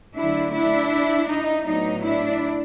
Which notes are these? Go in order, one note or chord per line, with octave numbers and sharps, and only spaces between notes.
D3 F#3 A3 D4 E4
D4 E4
D#4
A2 F#3 B3 D4 D#4
D4 E4